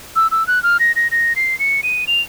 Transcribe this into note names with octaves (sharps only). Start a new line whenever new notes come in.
E6
E6
F#6
F6
A#6
A#6
A#6
C7
C#7
D#7
F7